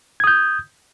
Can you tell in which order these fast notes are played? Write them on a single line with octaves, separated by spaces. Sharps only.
G#6 D#6 G6